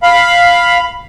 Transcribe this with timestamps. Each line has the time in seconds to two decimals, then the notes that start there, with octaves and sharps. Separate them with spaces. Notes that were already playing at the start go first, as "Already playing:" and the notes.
0.03 F5 B5